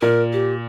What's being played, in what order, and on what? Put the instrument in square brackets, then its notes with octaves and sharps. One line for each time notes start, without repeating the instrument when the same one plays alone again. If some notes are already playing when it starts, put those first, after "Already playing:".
[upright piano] A#2 [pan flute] A#4
[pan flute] G4